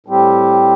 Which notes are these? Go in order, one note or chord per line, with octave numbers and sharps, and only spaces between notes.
A2 G3 C4 G4